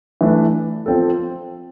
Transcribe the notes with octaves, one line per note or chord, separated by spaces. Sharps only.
E3 A3 D4
F3 C4 F4 A4